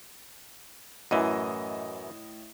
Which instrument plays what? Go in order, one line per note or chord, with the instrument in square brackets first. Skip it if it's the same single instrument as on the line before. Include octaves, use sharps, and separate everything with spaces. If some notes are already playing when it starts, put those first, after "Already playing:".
[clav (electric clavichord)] F#2 E3 [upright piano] A2 D#5 D#7